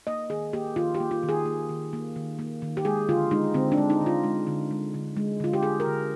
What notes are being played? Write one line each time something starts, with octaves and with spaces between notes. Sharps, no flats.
A#3 D#5
D#3 G#4
A#3 G4
D#3 F4
G4
A#3
F4
D#3
G#4
A#3
D#3
A#3
D#3
A#3
D#3
G4
G#3 G#4
D3 F4
G#3 D#4
D3 C4
D4
G#3
D#4
D3
F4
G#3
D3
G#3
D3
G#3
D3 F4
G4
G#3 G#4
A#4
D3